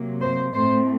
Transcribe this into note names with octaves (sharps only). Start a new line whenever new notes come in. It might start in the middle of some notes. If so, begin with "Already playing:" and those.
Already playing: C3 F#3 A#3
C5
A2 A3 C4 C5